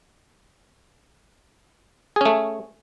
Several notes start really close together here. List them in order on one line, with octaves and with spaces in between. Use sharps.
G#4 C#4 A3